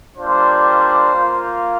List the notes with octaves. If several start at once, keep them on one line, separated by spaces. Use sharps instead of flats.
G3 A#3 D4 F4 C5
A#3 F4